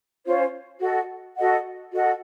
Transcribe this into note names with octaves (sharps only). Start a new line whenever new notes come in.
C#4 F4 C5
F#4 A4 D#5 F#5
F#4 A4 D#5 F#5
F#4 A4 D#5 F#5